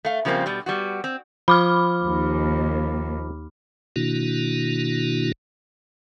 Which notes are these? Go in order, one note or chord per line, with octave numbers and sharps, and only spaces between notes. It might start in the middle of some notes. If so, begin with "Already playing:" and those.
A3 F5
C#3 F3 G3 A#3 C4
B2 G3
G3 B3 F#4
C4
F3 B5 D6 F6
D#2
B2 D#3 A#3 D4 E4 F#4